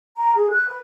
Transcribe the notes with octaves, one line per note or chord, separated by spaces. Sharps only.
A#5
G#4
F#6
B4